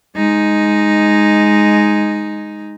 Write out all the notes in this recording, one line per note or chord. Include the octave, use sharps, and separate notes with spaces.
G#3 D#4